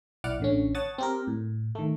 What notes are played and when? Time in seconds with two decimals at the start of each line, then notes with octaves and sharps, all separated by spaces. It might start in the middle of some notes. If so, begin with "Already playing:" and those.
0.24 B1 E4 D5 F#5 D6 F6
0.40 A1 D3 C#4
0.75 C#5 F#5 A5 D#6 A6
0.98 C4 G4 A#4
1.28 A2
1.75 D#3 A3